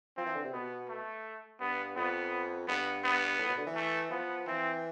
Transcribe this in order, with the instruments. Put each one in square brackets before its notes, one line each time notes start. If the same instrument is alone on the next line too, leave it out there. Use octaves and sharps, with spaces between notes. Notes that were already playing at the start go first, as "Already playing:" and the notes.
[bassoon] F3 [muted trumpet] C4
[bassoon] E3
D3
C3
[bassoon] B2 [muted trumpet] B3
[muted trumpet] A3
[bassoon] G2 [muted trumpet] B3
[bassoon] F2 [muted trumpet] B3
[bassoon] G2 [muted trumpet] B3
[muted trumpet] B3
[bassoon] A2
B2
D3
E3
[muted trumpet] A3
[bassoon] F3 [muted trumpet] B3
[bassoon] E3 [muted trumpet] C4